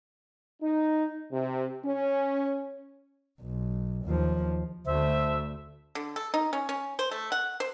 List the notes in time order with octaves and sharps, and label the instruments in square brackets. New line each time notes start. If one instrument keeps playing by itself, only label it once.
[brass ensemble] D#4
C3
C#4
[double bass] B1
D#2 F3
[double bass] D2 A3 [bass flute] C5 [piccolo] E5
[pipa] D3
A4
D#4
C#4
C#4
C5
A3
F#5
C5